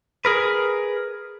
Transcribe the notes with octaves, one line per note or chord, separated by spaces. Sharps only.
G#4 A#4 B4